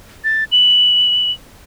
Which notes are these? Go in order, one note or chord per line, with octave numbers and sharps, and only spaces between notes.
A6
F#7